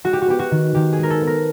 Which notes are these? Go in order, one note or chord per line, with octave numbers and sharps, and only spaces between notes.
G#3 F#4
G4
F#4
B3 G4
F#4
D#3
D#3 G4
G#4
G#3 A#4
A4
B3
A#4